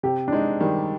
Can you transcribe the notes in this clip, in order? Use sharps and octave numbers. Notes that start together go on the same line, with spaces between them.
C3 G4
D4
G#3 D#4
D#3 G3